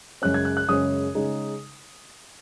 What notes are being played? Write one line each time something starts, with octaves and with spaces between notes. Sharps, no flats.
F#2 C#3 G#3 C#4 F#6
G#6
F#6
F#6
F#2 C#3 G#3 C#4 D#6
C#3 G#3 D#4